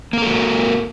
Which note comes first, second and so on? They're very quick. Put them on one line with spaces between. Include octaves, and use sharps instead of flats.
A#3 A#4 A4 F#4